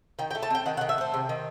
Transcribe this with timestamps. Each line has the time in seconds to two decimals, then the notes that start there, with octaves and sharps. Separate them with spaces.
0.19 D#3 G5
0.31 G5
0.35 A3
0.43 A5
0.50 C4 G5
0.66 D#3 F#5
0.77 F#5
0.81 D#3
0.89 E5
0.98 A3 C5
1.14 C3
1.29 D#3